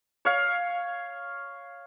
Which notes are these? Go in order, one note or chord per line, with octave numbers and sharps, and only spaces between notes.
C#5 F5